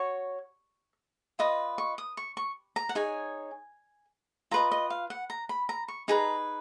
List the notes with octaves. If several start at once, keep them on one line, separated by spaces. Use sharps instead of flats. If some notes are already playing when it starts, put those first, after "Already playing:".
Already playing: F#4 C#5 C#6
F4 B4 D#5 D#6
C#6
D#6
C#6
C#6
A#5
F#5
D#4 G#4 C#5 G#5
F4 B4 D#5 A#5
D#5
F5
F#5
A#5
B5
A#5
C#6
D#4 G#4 B4 A#5